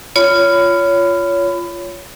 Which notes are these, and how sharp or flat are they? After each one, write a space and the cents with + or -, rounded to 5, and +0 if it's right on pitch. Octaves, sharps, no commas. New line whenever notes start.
F4 -10 C#5 +20 B5 +20